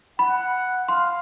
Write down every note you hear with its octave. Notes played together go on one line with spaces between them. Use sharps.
F#5 B5
F5 C6